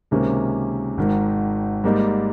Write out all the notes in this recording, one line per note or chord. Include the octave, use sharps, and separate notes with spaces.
C#2 C3 D#3 A#3 C#4
G#1 G#2 D#3
G#2 G3 A#3 D#4